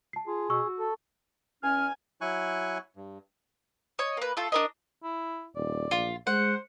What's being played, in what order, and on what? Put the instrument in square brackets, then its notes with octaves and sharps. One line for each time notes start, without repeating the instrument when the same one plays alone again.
[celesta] A5 C7
[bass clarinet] F4 [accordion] G#4
[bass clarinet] B2 [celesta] C#6 E6
[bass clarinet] F#4
[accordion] A4
[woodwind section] E2 C#4 F6 [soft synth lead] G#5
[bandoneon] F#3 E4 G#5 C#6 F#6
G2
[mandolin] C#5 D#5
A#3 B4
A3 F4 A4
D4 A#4 D#5
[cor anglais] E4
[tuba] D#1 [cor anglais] D5
[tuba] A#1 [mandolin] F4
[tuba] G#3 [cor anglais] C5 [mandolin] F#5